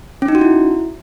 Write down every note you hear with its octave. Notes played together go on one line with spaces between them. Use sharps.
C#4
D#4
F#4
E4